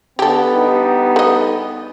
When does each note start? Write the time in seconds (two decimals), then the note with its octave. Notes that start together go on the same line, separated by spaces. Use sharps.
0.19 D3 B3 G4 A4
0.52 G2 G3 D#4
1.16 A3 D#5